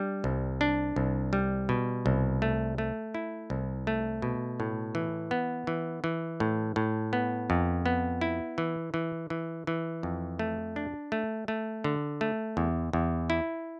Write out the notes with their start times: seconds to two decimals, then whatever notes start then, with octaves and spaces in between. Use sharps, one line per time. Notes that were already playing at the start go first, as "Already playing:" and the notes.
Already playing: G3 D4
0.24 C2
0.61 D4
0.96 C2
1.33 G3
1.69 B2
2.06 C2
2.42 A3
2.78 A3
3.14 E4
3.50 C2
3.87 A3
4.22 B2
4.60 A2
4.95 E3
5.31 B3
5.67 E3
6.04 E3
6.40 A2
6.76 A2
7.13 B3
7.50 F2
7.86 B3
8.21 E4
8.58 E3
8.94 E3
9.30 E3
9.67 E3
10.03 F2
10.39 A3
10.76 D4
11.12 A3
11.48 A3
11.84 D3
12.21 A3
12.57 E2
12.93 E2
13.30 E4